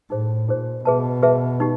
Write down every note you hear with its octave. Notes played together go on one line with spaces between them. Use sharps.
A2 D#4 G#4 C5
A#2 D#4 G#4 C5
B2 G#4 B4 E5 A5
G#4 B4 E5 A5
D#4 G4